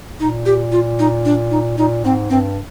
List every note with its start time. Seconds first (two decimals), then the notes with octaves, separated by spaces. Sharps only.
0.19 A#2 D#4
0.46 G4
0.72 F4
0.99 D#4
1.25 D4
1.51 D#4
1.78 A#2 D#4
2.05 G#2 C4
2.30 G2 C4